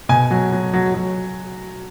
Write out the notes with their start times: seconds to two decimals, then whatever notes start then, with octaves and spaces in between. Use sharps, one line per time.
0.09 B2 G#5
0.31 F#3
0.52 F#3
0.73 F#3
0.94 F#3